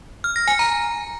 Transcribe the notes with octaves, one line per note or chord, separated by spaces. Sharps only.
F6
A#6
G#5
A#5